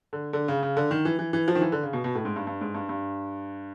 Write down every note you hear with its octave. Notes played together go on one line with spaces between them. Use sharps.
D3
D3
C#3
C#3
D3
D#3
E3
E3
E3
F3
D#3
E3
D3
C#3
B2
B2
A2
G#2
G2
G2
G#2
G2
G2